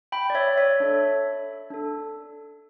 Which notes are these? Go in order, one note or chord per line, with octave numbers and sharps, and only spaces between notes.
G5 B5
D5
C#5 E5
C#5 E5
D4 A4
D4 A4